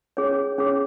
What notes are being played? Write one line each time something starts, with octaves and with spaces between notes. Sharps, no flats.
C#4 G#4 C#5
C#4 G#4 C#5